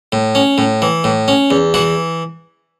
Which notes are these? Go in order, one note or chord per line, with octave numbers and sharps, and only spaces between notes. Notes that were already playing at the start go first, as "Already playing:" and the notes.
A2
C#4
A2
E3
A2
C#4
E2
E3 F#4